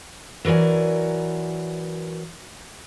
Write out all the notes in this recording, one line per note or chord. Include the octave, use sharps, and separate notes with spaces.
E3 F#3 A#4 D5 G#5